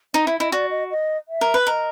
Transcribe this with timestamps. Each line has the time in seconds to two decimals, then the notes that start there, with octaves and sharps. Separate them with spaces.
0.14 D#4 D#5
0.26 E4 E5
0.40 E4 D#5
0.52 F#4 D5
0.71 D#5
0.91 D#5
1.28 E5
1.41 A#4
1.54 B4
1.67 A#4 D#5